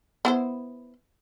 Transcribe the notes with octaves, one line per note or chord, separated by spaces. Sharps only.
B3 E4 C5